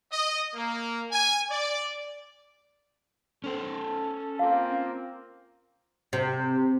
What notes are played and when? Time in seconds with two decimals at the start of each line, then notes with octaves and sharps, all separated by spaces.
0.12 D#5
0.53 A#3
1.11 G#5
1.50 D5
3.44 C#4 A4 C5
4.39 A#3 C4 F4 F5
6.13 C3